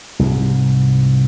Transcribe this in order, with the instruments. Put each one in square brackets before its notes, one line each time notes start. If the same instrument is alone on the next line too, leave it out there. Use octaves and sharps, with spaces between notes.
[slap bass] C2 G#2